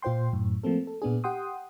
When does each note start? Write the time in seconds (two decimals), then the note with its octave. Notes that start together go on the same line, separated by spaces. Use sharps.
0.02 A#2 F4 C5 G5 C6
0.33 F#2 A2
0.63 F3 A3 A#3 C4 A4
0.87 A4
1.02 A#2 B3 D4 G#4
1.24 G4 F#5 G5 C6 D#6